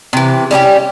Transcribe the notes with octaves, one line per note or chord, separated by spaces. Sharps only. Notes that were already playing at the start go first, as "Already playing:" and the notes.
C3 E3
G3 C#4 D#4 G4